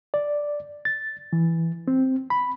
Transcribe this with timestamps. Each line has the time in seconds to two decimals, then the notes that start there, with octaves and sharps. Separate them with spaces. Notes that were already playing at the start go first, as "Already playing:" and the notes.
0.14 D5
0.85 A6
1.33 E3
1.88 C4
2.30 B5